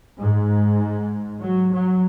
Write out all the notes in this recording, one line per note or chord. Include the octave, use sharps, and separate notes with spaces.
G#2
F#3
F#3